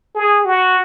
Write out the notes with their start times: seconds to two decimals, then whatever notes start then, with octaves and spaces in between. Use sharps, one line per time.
0.15 G#4
0.45 F#4